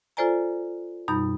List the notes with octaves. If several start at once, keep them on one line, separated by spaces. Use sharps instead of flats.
F4 A4 C5 D5 G#5 A#5
F#2 B2 G3 D#4 B5 G6